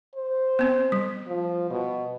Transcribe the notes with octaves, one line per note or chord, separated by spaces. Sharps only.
C5
B3 C4
G3
F3
B2